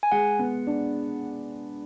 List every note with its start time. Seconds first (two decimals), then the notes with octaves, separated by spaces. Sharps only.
0.03 G#5
0.12 G#3 F#5
0.39 B3
0.67 D4